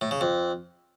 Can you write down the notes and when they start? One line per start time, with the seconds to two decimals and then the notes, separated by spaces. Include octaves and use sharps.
0.01 A2
0.11 C#3
0.21 F2